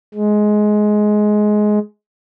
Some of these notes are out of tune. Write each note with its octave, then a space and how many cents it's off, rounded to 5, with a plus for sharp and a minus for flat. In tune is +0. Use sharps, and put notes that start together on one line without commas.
G#3 +15